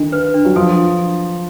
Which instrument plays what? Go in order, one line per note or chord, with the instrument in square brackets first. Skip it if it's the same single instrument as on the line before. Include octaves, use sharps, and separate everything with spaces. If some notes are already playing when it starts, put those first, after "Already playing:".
Already playing: [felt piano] D3 D#3 [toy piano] D4
[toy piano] B4
D4
[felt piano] F#3
[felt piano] F3 [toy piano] A4